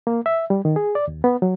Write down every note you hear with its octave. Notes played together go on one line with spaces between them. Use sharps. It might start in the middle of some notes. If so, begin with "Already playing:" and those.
A#3
E5
G3
D#3
G#4
D5
D#2
B3
F#3